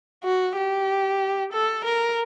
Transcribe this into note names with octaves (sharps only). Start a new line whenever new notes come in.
F#4
G4
A4
A#4